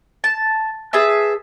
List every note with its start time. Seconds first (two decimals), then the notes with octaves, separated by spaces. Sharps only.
0.24 A5
0.93 G#4 B4 E5 A5